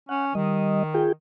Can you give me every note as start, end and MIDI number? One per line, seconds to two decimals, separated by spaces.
0.09 0.35 61
0.09 0.25 78
0.35 1.11 51
0.35 0.83 55
0.35 0.83 75
0.94 1.12 65
0.94 1.12 68
0.94 1.12 79